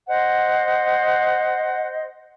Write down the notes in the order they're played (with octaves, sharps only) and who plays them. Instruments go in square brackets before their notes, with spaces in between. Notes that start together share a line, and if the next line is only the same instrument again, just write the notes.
[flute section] C5 D#5 [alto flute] F#5